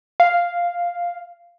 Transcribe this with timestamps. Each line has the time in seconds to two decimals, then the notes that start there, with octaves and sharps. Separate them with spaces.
0.20 F5